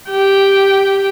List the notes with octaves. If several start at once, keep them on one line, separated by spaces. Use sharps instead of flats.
G4 G5